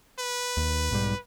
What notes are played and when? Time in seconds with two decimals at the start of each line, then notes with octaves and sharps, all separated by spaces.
0.19 B4
0.57 D#2
0.91 B1 G#2 G3